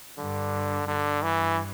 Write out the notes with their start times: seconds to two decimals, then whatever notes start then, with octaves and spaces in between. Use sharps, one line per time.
0.18 G2 D3
0.88 G2 D3
1.23 E3